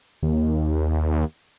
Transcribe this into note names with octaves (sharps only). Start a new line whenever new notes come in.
D#2